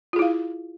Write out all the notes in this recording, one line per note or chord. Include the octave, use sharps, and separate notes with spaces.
E4 F4 G#4 F5